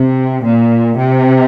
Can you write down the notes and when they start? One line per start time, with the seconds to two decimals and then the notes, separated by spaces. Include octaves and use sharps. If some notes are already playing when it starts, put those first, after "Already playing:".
Already playing: C3
0.44 A#2
0.97 C3